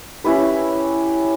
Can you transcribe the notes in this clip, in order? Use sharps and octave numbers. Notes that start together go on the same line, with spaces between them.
C#4 E4 G4 B4